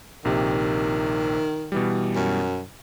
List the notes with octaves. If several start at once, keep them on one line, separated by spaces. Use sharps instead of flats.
A#1 C3 D#3 G4
B2 E3 G3
F#2